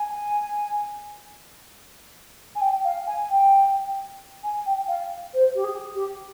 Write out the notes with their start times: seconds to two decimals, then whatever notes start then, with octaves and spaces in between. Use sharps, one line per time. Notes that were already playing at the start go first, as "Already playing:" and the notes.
Already playing: G#5
2.55 G#5
2.61 G5
2.84 F5
3.07 G#5
3.30 G5
4.43 G#5
4.66 G5
4.88 F5
5.34 C5
5.55 G4
5.64 G#4
5.94 G4